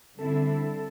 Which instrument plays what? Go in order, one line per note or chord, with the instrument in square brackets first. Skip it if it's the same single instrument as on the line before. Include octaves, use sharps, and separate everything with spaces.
[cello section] D3 G3 C4 E4 [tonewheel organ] A4